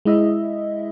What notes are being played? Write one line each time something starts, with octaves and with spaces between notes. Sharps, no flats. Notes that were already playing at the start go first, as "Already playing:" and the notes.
G#3 E4 D#5 E5